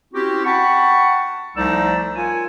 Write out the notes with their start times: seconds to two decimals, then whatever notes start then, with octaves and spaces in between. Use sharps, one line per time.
0.13 C4 C#4 E4 F#4 G4
0.45 F#5 G5 A5 B5 C#6
1.56 C2 F3 A3 D#4 D5 E6
2.15 F4 A#4 C#5 G#5